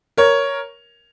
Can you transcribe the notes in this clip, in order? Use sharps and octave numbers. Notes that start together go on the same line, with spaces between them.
A#4 C#5